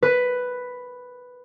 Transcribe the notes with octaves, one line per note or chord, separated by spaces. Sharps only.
B4